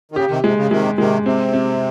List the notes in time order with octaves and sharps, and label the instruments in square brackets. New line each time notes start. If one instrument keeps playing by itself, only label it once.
[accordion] D#3
[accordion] C#3 [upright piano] G4
[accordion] C3 D#3
[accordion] C3 [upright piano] G#3
[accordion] C#3
[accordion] C3 D#3 [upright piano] G#3
[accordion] C3 D#3 [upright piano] G#3
[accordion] C3 [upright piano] C4
[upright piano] C4